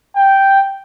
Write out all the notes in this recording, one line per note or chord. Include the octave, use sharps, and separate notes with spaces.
G5